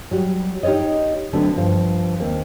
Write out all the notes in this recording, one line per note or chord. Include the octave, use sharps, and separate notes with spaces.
F#3 G3 F#4
D#4 G4 G#4 C#5 D#5
D3 F#3 A3 B3 C4 D4
G2 F3 C5 F5
D#2 A#3 C4